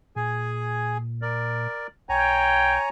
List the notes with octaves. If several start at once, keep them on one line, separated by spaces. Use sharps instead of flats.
A#2 G#4 G#5
A#4 D5
B1 C#5 G5 G#5 A#5